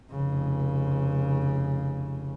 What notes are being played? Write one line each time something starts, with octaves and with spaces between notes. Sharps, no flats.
F1 C#3